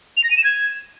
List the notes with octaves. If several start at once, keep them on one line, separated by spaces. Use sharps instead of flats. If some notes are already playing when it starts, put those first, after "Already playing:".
F7
A#6
D#7
E7
G#6